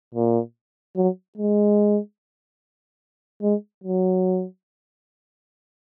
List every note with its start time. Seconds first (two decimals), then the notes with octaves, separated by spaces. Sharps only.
0.14 A#2
0.96 F#3
1.37 G#3
3.42 G#3
3.84 F#3